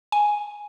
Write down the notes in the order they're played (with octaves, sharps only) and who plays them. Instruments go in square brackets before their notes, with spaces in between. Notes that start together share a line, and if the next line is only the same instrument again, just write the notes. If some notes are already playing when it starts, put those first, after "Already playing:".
[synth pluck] G#5